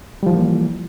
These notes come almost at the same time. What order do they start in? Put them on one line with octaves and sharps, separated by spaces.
G3 F3 E3 A#3